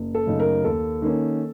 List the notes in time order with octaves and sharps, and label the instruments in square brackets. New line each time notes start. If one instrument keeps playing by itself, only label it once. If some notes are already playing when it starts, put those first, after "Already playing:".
Already playing: [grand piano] F#1
A4
F#2 C#3 A3 D#4
A#4
D#2 A4
D#3 A#3 C#4